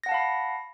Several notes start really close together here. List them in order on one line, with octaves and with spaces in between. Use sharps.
A#6 F#5 A5 F5 B5